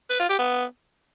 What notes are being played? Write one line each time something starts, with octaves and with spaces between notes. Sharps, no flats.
B4
F4
G4
B3